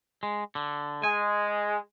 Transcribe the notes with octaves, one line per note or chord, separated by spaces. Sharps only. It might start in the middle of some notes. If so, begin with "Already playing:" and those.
G#3
D3
G#3 G#5